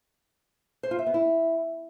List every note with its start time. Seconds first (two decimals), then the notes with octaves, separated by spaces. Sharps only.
0.83 C5
0.91 F4
0.99 E5
1.06 B3
1.14 E4